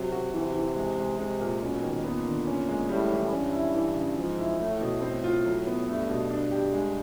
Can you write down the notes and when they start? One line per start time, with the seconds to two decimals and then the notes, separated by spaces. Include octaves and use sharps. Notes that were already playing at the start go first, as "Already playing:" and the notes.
Already playing: C3 F#3
0.12 F#4
0.34 C3 E3
0.55 E3
0.76 G#3
0.97 G#3
1.19 C3 G#3
1.40 A#2
1.61 B2 C#4
1.83 D#3
2.04 A#2 B3
2.25 D3
2.47 C#4
2.68 G#3
2.89 A2 G3
3.11 E3
3.32 G2 C#4
3.53 E4
3.75 E3
3.96 C#3
4.17 G#2 F3
4.38 E4
4.60 A2 A3
4.81 B2
5.02 A2 C4
5.24 F4
5.45 F#3
5.67 B3
5.88 G2 A3
6.10 B2
6.30 G2 D4
6.51 G4
6.73 G#3